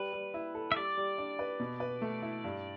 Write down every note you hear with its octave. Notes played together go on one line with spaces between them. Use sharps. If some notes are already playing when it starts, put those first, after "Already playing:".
Already playing: G3 G4 B4
G3
E4
A4
E5
G3 D5
G3
D4
B4
B2
B4
A3
E4
G2